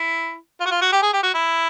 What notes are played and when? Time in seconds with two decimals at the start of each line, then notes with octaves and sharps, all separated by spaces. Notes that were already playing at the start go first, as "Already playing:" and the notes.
Already playing: E4
0.60 F4
0.66 F#4
0.71 F4
0.81 F#4
0.92 G4
1.02 G#4
1.14 G4
1.23 F#4
1.34 E4